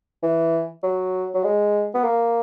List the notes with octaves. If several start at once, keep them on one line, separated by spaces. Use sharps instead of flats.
E3
F#3
F#3
G#3
B3
A#3